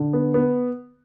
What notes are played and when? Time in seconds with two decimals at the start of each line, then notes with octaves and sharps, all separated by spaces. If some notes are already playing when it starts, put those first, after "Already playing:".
Already playing: D3
0.13 B3
0.34 B3